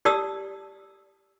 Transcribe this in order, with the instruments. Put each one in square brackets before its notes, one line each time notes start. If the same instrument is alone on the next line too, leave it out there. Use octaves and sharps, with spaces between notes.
[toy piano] G4 D5 A5 D#6 E6